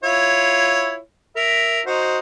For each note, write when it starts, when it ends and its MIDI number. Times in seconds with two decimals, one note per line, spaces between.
0.04 0.97 64
0.04 0.97 65
0.04 0.97 73
1.36 1.80 70
1.36 1.80 76
1.86 2.19 63
1.86 2.19 66
1.86 2.19 72